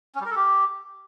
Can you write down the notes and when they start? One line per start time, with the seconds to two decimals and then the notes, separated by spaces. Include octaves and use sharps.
0.15 C#4
0.20 G3
0.25 A#4
0.31 A4
0.36 G4